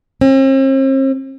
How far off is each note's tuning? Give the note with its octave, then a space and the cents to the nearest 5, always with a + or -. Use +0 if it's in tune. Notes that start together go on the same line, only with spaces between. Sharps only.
C4 +45